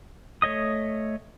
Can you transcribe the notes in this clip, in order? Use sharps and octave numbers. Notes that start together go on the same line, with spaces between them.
A3 C#5 D#5 D#6